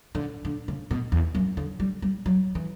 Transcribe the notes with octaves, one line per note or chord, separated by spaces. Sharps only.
D3
D3
C#3
B2
E2
F#2
D3
G3
G3
F#3
E3